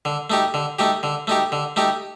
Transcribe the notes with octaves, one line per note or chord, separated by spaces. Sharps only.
D3
A3 D#4 G4
D3
A3 D#4 G4
D3
A3 D#4 G4
D3
A3 D#4 G4